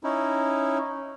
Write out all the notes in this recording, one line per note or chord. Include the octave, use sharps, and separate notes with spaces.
C#4 D#4 E4